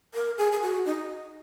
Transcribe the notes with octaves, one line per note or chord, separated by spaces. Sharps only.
A#4
G#4
G#4
F#4
D#4